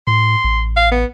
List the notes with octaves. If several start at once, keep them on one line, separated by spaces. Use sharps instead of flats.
A2 C6
A1
F5
B3